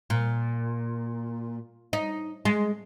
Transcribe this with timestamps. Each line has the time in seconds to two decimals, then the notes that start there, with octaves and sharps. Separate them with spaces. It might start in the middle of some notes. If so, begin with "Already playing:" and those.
0.10 A#2
1.93 D#4
2.45 G#3